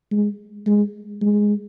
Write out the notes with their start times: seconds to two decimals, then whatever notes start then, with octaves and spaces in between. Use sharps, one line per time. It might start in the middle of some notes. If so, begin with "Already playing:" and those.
0.11 G#3
0.66 G#3
1.21 G#3